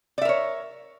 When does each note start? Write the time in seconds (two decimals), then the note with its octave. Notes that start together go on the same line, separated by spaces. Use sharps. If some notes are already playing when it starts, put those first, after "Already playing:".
0.18 D5
0.21 E5
0.25 A#4
0.29 C#5